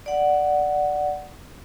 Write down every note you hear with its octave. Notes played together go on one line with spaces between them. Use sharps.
D5 F#5